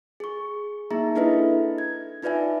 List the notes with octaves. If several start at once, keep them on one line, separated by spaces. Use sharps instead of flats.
G#4 C#6
A#3 D#4 G#4 E5 A#5
D4 E4 A4 B4 D#5 E5
G#6
D#4 F4 B4 D5 E5 G#5